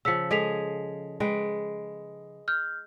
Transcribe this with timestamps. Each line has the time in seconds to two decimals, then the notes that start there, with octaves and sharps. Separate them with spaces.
0.05 C#3 F3 E6 B6 C#7
0.31 G#3 G#4 A4 B6 F7
1.20 G#3 B4 G5
2.48 F6 G6